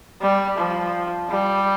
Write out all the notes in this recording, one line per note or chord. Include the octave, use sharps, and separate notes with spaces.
G3
F3
G3